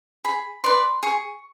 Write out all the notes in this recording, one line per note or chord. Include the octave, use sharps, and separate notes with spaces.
G#4 B5
B4 D5 C6
G#4 C#6